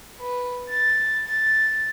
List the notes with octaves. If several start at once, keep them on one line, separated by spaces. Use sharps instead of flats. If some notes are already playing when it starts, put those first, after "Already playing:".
B4
A6
A6